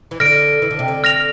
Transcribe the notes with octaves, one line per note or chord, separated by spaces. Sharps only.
E3
D3 F6 A#6 D7
E3
D3
C3
D3
F6 A#6 F7